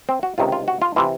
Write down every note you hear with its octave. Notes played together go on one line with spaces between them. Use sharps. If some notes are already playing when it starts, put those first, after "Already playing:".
C4
F#4
C#2 C3 D#3 F4
F4
F#4
F4
C3 E3 F4